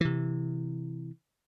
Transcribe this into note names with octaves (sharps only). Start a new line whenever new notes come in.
C3 E3